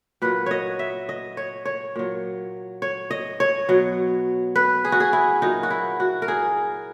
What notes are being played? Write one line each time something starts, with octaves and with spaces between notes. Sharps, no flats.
A#2 F#3 B4
C#5 D#5
E5
D#5
C#5
C#5
A#2 F#3
C#5
D#5
C#5
B2 F#3
B4
G#4
F#4
G#4
E4
A#2 F#3 D#4
F#4
E4
F#4
A#4
G#4